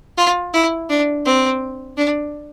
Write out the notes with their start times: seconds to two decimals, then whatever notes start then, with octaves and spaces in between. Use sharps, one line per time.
0.17 F4
0.54 E4
0.89 D4
1.26 C4
1.97 D4